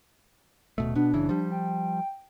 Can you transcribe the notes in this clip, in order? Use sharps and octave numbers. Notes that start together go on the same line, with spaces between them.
D#1 B2 A3
B2 B3 D4
F#1 C#3 E3
F3 G3
G5